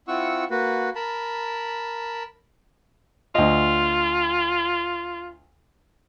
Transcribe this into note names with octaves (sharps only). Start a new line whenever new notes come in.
C4 E4 F4 F#5 C#6 E6
A#3 F#4 B4
A#4 A5 B5
D2 F4 D#5